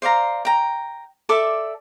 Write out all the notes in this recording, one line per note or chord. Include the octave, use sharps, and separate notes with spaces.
C5 D5 F5 A#5
G5 A#5
A4 D5 E5 D6